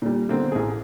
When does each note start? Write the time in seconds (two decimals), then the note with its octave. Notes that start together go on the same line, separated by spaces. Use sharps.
0.02 A#2 G3
0.29 B2 D3 A#3 C4
0.52 A1 G#4